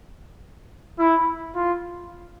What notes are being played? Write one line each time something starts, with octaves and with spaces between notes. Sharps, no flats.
E4
F4